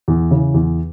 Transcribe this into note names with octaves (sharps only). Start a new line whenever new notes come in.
E2
C#3 E3
E2